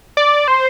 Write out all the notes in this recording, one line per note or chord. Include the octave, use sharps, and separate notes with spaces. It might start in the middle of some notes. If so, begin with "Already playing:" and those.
D5
C5